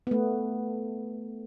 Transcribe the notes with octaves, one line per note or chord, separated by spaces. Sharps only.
A3 B3